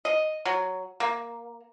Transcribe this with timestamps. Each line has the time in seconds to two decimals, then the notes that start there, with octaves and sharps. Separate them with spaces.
0.05 D#5
0.45 F#3
1.00 A#3